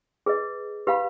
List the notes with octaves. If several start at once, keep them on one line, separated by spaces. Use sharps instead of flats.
G#4 B4 D#5
G4 B4 F5 B5